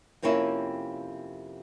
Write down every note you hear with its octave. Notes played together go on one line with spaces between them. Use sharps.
F2 C3 A#3 C#4 E4